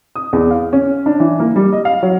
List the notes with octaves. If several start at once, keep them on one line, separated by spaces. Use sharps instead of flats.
D#6
E2
F5
C#4
D4
E3
A#3
G3
D#5
F5
F#3